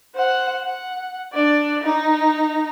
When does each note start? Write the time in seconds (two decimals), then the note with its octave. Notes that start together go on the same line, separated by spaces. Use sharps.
0.15 C5 F#5
0.63 F#5
1.33 D4 D5
1.83 D#4 A#5